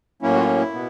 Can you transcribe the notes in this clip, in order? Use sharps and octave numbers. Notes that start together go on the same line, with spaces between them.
A2 F#3 A#3 C#4 E4
F#4
F4
E4
B2 B3